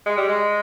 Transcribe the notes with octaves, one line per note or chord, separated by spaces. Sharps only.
G#3
G3
G#3